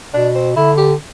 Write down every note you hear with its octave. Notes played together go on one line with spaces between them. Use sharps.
B2 D4
C4
D3 E4
G4